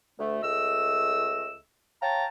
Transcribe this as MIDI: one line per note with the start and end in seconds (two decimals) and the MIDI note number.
0.19 0.38 38
0.19 0.38 57
0.42 1.56 37
0.42 1.56 57
0.42 1.56 75
0.42 1.56 88
2.02 2.25 73
2.02 2.25 77
2.02 2.25 79
2.02 2.25 81
2.02 2.25 82